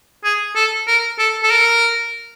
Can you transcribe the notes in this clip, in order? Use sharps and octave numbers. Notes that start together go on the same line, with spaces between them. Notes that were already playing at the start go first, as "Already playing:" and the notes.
G#4
A4
A#4
A4
A4
A#4